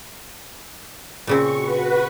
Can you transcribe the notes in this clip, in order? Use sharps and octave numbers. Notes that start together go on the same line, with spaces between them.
A#2 C#3 C4 C#6
F#4 B4